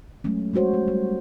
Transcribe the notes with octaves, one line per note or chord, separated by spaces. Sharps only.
F#3 G#3 A3 C#4
G3 G#3 F#4 C5 C#5
A3
G3